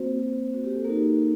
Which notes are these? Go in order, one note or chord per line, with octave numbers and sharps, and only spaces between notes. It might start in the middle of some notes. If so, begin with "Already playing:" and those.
Already playing: A#3 C4 F#4 C5
F#4
G4
A4
A#3 D#4 F#4 A#4